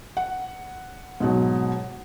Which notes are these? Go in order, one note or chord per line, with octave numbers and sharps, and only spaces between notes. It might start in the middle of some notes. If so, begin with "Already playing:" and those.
F#5
G#2 B2 F#3